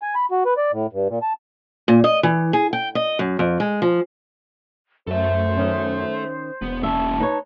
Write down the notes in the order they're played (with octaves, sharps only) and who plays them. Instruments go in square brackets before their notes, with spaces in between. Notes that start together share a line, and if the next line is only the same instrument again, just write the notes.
[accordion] G#5
B5
F#4
B4
D5
A2
G2
A#2
A5
[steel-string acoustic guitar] A#2
D#5
E3
G#4
G5
D#5
F#2
F2
G#3
F3
[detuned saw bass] F#2 [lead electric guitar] A4 E5 [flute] C5
[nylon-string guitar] D#3 C#4
[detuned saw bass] E1 [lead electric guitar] B3
[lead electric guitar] A#3 C#4 [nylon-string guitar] E5 [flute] A5
[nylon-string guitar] D#4 B4 C#5